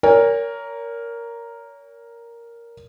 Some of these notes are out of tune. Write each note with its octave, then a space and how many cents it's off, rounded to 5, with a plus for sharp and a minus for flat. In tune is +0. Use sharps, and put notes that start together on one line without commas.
A#4 +0 C#5 +35 G#5 -40